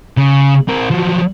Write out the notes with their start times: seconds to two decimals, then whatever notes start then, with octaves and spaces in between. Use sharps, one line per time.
0.17 C#3
0.69 C4 A#4
0.91 F3 F#3